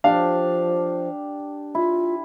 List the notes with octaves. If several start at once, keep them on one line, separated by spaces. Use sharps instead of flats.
F3 D4 G4 F5
E4 F4